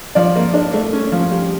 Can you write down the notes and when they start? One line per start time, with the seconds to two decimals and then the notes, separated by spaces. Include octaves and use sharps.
0.15 F3 D5
0.36 A#3
0.54 D4
0.74 A3
0.93 C#4
1.12 F3
1.31 G3